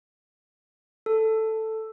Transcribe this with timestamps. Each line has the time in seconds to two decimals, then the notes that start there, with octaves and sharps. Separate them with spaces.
1.06 A4